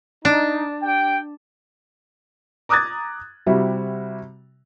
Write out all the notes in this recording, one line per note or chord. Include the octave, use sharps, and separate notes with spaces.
D4 D#4
G4 G5
A#5 D6 D#6 F#6 G#6 A6
C3 G3 E4 F#4